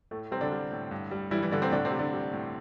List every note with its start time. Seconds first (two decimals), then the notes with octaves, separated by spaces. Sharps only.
0.11 A2 A3
0.31 C3 G3 C4
0.41 D3 D4
0.52 G3
0.72 A2
0.91 G2
1.11 G3
1.31 E3 G3 E4
1.41 E3 E4
1.52 G2 D3 D4
1.61 C3 C4
1.71 A2 D3 D4
1.85 C3 C4
1.92 G3
1.99 D3 D4
2.13 G3
2.33 A2